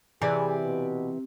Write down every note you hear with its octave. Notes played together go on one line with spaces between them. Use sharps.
C3 E3 G#4 D5 G#5
B2